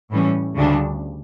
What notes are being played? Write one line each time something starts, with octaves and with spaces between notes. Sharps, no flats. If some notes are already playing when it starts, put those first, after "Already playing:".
A2 E3 G3 C#4
D2 C#3 G3 D4